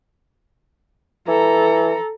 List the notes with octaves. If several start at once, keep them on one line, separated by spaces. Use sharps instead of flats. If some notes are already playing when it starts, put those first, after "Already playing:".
E3 A4 A#5